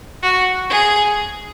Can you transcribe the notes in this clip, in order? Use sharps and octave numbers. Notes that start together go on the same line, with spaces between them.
F#4
G#4